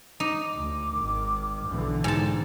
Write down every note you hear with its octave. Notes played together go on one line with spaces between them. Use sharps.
D#4 D6
D2
G#1 D#3
B1 D3 E3
G#2 A5